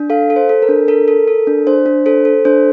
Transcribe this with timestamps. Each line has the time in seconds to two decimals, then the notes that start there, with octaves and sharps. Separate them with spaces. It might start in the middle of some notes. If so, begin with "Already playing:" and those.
Already playing: D4
0.10 A4 F5
0.30 A4
0.36 C5
0.49 A4
0.62 A#4
0.69 D4
0.88 A4 A#4
1.08 A4
1.28 A4
1.47 D4
1.67 D4 C5
1.86 D4
2.06 A4 C5
2.25 A4
2.45 D4 C5